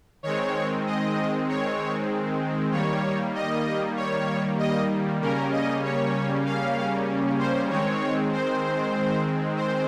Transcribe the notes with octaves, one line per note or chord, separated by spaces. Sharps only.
D#3 G#3 C4 C#5
D#5
C#5
D#3 G3 A#3 C#5
D#5
C#5
D#5
C#3 G3 A#3 C#4 A#4
D#5
C#5
F5
C5
D#3 G#3 C4 C#5
C5
C5